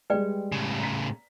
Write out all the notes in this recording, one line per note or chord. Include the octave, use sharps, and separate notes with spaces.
G3 G#3 B4 D5 G5
A2 C#3
A#5 B6